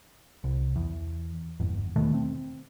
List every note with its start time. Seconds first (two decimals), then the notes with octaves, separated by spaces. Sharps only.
0.44 C2
0.76 E2
1.60 G1 E2
1.96 D#2 B2 D#3 A3
2.14 C4